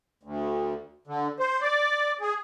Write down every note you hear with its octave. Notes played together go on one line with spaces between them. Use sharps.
D2
D3
C5
D5
G#4